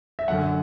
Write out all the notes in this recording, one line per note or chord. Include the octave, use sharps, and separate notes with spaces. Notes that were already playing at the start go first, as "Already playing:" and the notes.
E5
F#2 D3 F#3 F#5